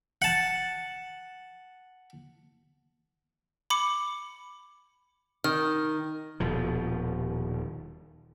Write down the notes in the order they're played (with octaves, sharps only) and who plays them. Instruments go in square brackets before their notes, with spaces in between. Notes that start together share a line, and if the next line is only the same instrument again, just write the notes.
[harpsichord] F#5 A5
[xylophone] B5 D6 C#7
[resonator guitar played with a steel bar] D#3 [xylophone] F6
[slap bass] D#1 B2 F3